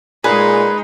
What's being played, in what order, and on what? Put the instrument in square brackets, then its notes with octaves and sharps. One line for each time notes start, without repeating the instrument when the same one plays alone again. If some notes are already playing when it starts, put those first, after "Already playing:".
[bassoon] A#2 [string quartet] G#3 D#4 [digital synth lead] G#4 [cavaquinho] B4